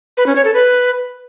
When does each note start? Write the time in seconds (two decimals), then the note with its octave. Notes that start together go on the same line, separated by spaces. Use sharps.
0.17 B4
0.26 C#4
0.36 C#5
0.45 A4
0.54 B4